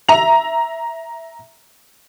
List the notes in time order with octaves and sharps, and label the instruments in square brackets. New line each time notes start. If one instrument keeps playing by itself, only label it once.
[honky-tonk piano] E5 A#5 F7